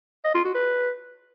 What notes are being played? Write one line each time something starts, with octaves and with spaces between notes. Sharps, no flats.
D#5
F4
F#4
B4